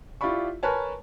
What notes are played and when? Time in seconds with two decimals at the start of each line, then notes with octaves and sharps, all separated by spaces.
0.21 E4 F4 G4 D5 B5 C#6
0.63 A#4 B4 C#5 G#5 A5